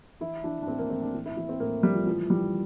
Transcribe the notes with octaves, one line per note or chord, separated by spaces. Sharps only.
E3 E4
E3 D4
D4
A2 C4
A#3
A2 C4
D4
E3
E4
E3
C4
A2 A#3
A2 G3
F3
E3 F3
E3 G3